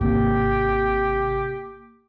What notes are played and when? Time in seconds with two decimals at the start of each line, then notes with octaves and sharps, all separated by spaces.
0.01 G#1 C3 A#3 G4